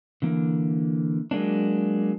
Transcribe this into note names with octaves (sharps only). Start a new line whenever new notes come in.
D3 E3 A#3
F#3 G#3 A#3 D4